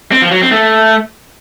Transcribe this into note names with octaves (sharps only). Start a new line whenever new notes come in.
C4
F3
F#3
C4
A3